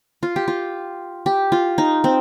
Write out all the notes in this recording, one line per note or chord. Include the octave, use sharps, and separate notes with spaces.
F4
G4
F4
G4
F4
D#4
C4